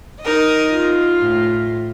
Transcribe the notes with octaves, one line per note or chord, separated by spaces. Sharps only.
D#4 A#4 D#5
F4
A2